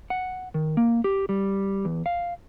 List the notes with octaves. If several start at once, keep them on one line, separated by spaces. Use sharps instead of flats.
F#5
D#3
A#3
G4
G3
E2
F5